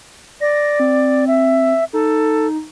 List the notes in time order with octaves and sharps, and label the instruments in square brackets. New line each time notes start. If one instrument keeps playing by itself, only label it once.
[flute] D5 [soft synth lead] A#6
[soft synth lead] C4
[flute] E5
[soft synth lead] D#4 [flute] A4